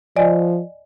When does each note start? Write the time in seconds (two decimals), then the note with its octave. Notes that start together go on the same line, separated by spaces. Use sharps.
0.16 F3 D5 D#5 G#5